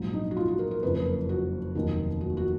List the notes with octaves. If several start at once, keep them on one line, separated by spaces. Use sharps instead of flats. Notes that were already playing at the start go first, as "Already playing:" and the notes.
Already playing: A#1 G#2 F#3
D#4
F#4
F4
F#4
A#4
A#4
F#1 F2 C#3 B4
B4
A#4
F#4
F1 D#2 D#3 F#3
F#4
F#4